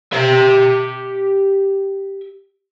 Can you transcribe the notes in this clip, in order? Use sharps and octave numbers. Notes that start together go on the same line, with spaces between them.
G4 E5